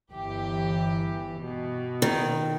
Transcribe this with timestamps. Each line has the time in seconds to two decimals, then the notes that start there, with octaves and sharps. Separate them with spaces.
0.12 G1 E3 G4
1.40 B2
2.02 D#3